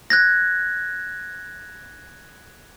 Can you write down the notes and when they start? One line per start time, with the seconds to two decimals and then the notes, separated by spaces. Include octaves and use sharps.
0.10 F#6 G#6 A#6